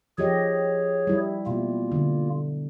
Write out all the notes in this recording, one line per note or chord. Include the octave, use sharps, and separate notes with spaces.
F3 G4 G#4 C#5 D#5
G3 E4
B2 A#3 F4
D3